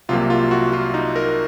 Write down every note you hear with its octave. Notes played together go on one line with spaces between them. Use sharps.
C2 C3 F#3 A#3 F4
F4
F#4
F4
D#4
A#4